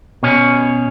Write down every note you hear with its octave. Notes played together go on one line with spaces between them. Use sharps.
B2 C#4